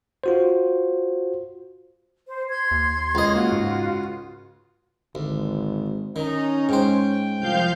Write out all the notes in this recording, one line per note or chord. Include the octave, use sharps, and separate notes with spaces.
F4 F#4 C5
C5
C6 G#6
D#2
C#2 D#5
A#3 F4 F#4
G#2
G#1 D2
D#3 C#4 D#4
G#2 C5 G5
C2 F3 F5 G6